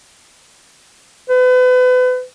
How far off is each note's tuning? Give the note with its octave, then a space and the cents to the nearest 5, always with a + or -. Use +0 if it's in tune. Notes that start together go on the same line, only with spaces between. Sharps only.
B4 +35